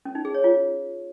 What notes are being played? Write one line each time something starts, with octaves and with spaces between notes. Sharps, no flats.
C#4
D#4
G#4
C#5
F4